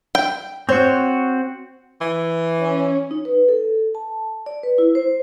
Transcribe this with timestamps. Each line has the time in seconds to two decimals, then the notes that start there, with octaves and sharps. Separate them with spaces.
0.15 G5
0.69 C4 F#4 C5 C#5
2.01 E3
2.60 C#4
3.11 D#4
3.25 B4
3.48 A4
3.95 A5
4.46 D5
4.63 B4
4.78 E4
4.95 C5